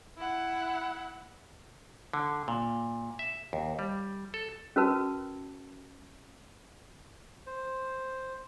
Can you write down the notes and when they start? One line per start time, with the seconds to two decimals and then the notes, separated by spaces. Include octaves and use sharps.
0.18 E4 F#5
2.13 D3
2.48 A#2
3.19 E5
3.53 D#2
3.79 G3
4.34 A4
4.76 C#4 F#4 A#4 B4 A5
7.47 C5